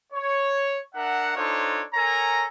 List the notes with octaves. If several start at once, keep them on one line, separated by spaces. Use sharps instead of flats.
C#5
D4 A#4 E5 F#5
D4 D#4 F4 A4 C5 C#5
A4 A#4 C#5 G#5 A#5